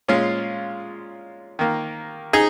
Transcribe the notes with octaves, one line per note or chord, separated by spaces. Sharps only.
A#2 G#3 C#4 F4
D#3 A#3
D#4 G#4